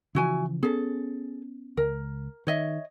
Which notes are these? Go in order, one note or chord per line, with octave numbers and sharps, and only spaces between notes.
C#3 E3 F3 E4 F#4 G#5
B3 C#4 G#4 A4
C#2 A#4
D#3 C#5 D#5 E5